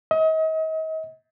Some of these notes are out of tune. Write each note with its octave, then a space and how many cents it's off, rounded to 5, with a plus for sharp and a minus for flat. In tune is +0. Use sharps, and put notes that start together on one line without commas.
D#5 +35